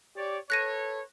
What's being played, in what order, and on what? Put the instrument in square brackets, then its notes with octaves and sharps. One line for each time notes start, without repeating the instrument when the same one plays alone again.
[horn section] G4 C#5 D5
[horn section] A4 B4 C#5 [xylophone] F#6 A#6 D#7